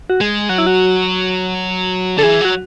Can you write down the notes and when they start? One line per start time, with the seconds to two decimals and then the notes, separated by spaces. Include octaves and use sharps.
0.10 F#4
0.21 G#3 G#4
0.49 F#3 F#4
0.58 E4
0.67 F#4
2.17 D3 A4
2.23 E3 G#4
2.41 F#3 F#4